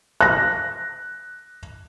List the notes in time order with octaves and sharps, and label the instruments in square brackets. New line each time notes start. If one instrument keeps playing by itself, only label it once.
[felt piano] F#6 A#6